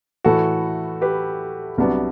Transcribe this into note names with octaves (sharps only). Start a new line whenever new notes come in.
A2 E3 A3 E4 F#4 A4
G4 B4
C2 C3 F#3 B3 D4